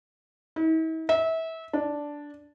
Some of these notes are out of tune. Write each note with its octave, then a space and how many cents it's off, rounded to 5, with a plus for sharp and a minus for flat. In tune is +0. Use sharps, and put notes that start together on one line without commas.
E4 -45
E5 -25
D4 -5